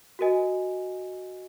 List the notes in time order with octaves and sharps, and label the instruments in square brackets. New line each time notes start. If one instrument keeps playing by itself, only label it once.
[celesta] F#4 A#4 D#5 G#5